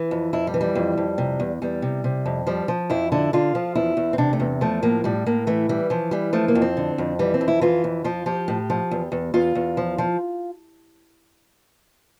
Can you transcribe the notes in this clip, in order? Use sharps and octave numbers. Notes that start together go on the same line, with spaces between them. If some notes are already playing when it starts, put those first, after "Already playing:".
Already playing: E3
F2
F2 E4
G3
E3
G3
F2
F2
C3
E2
E2 G3
C3
C3
F2
F3 G3
F3
F2 E4
D3 E4
D3 F4
F3
E2 E4
E2
C4
C3 D4
A3
E2
F3 A3
A2 A#3
A2 G3
A2 A#3
E3 A3
E3 G3
E3 F3
E3 G3
F3 A3
A#3
F2
C4
D3
F2
E3 G3
C4
F2
E4
E3 F4
F2
F3 F4
F3 G4
A2
F3
E2
E2
E2 F4
E2
F3
F3